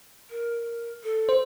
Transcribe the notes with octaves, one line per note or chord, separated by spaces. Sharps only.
A#4
A4
C5